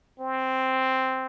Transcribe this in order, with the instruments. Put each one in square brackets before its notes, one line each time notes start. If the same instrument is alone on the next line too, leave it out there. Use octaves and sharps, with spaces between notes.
[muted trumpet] C4